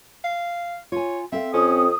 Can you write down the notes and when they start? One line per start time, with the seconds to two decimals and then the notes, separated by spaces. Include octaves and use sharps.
0.24 F5
0.92 F4 C#5 G#5
1.32 C4 A4 E5 F5
1.54 F2 C#4 D#6